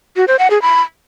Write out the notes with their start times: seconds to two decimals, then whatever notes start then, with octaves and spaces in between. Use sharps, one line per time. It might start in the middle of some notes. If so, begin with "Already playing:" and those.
0.16 F#4
0.28 C5
0.39 F#5
0.50 G#4
0.62 B5